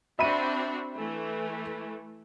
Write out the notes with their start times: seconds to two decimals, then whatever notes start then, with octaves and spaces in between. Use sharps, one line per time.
0.19 C4 D4 F#4 E5 B5 D#7
0.96 E3 A3